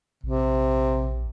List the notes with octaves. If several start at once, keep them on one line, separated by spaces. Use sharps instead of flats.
A#1 C3